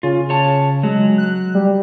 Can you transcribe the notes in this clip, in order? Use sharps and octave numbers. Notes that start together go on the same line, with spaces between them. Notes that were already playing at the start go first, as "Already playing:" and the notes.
C#3 F4
C#5 A5
F#3 G#3
F#6
G3